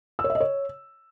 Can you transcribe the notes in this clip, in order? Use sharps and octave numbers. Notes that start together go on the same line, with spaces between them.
E6
C#5
E5
D#5
C#5